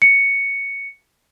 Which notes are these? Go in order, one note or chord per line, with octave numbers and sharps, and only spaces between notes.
C#7